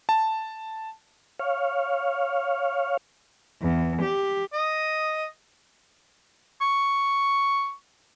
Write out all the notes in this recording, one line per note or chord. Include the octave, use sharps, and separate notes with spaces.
A5
C#5 F5
E2
G4
D#5
C#6